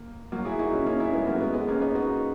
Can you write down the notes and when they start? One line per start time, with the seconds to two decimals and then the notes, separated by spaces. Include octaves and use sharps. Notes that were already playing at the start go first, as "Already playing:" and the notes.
Already playing: A#3
0.32 F#3 A#3
0.45 E4 G#4
0.59 D#4 F#4
0.72 C#4 E4
0.86 A#3 C#4
1.00 C#4 E4
1.13 G#3 B3
1.27 F#3 A#3
1.40 G#3 B3
1.54 G#3 B3
1.68 A#3 C#4
1.81 B3 D#4
1.95 D#4 F#4